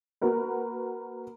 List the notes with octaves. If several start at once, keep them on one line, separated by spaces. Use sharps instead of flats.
A#3 F#4 A#4 B4